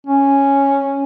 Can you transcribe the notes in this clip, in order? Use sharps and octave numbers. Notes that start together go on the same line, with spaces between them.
C#4